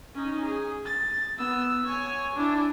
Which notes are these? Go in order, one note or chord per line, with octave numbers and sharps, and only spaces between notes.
C#4 D#4
G#4
A6
B3 E6
C#5 G#5
D4 E4